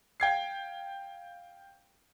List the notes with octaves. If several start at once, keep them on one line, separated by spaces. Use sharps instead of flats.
F5 G5 G#6 C7